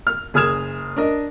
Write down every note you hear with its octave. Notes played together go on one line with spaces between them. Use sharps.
F6
F#1 G#4 D#6 F6 G#6 E7
D4 A#4 D#5